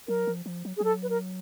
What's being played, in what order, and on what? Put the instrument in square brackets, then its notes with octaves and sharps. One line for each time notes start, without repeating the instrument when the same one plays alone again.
[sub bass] F#3 [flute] A#4
[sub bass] F3
F3
F#3
[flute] G#4
[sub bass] F#3 [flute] A4
[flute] B4
A#4